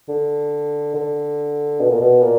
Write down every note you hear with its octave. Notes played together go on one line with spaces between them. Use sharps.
D3
D3
B2
A#2
B2
A#2